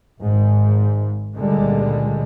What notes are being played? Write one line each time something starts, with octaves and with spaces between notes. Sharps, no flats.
G#1 G#2
C#2 A#2 D3 G3 G#3